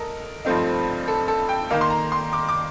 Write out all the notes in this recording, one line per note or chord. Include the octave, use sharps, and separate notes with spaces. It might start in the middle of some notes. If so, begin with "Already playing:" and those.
Already playing: A4 A#4 D#5
G2 F3 A3 C4 D#4
A4
A4
G5
D#3 A#3 D#4 F5
C6
A#5
C6
D6
D6